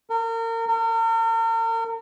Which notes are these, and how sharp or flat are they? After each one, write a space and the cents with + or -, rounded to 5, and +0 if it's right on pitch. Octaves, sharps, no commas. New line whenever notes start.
A#4 -35
A#4 -40